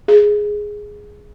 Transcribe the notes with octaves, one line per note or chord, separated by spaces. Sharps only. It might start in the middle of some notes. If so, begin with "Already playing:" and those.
G#4